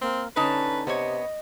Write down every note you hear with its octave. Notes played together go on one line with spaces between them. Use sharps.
A#3 C4
D3 C#4 D#4 B4 A5
C3 B3 C#5 D#5